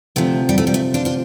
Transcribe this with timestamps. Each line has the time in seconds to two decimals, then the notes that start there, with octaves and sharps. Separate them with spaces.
0.16 D2 C3 F3 A3
0.49 G3
0.58 A3
0.67 G3
0.74 A3
0.94 D4 F4
1.05 D4 F4